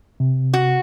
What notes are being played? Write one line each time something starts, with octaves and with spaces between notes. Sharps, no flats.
C3
F#4